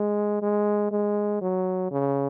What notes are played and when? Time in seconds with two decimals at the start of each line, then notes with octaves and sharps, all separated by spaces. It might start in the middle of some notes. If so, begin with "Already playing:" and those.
Already playing: G#3
0.42 G#3
0.92 G#3
1.42 F#3
1.91 C#3